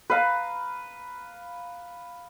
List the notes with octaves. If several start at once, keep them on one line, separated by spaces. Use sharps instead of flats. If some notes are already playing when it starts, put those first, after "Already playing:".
B4 F5 A#5